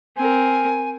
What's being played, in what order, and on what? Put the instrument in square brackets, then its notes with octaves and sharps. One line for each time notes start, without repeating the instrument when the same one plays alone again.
[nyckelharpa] C4 A#4 [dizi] G#5